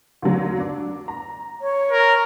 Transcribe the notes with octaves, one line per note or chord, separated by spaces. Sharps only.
D#2 D3 F#3
D4
A#5
C#5
A#4